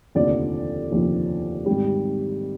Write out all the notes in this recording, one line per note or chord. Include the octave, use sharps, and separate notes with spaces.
F1 D#2 D3 F3 D5
F1 D#2 D3 F3
G#1 G#2 G3